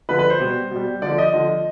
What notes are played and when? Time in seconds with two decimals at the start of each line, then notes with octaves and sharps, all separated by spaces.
0.09 D3 F3 B4
0.19 B4
0.30 C5
0.40 B2 G3
0.71 B2 G3
1.02 D3 F3 D5
1.18 D#5
1.33 D3 F3